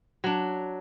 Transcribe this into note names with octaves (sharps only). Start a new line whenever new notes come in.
F#3 D4